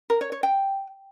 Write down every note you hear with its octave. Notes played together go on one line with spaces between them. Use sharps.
A#4
C#5
C#5
G5